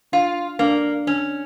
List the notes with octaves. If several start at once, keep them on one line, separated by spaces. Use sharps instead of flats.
D4 F4
A#3 D4
C#4 D4